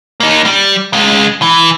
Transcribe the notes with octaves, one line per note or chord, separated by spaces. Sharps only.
A#3 D#4
G3
C#2 G#3
E3